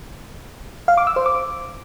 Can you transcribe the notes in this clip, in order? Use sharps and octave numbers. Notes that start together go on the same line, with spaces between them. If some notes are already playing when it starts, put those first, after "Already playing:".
F5
D6
E6
C5
D6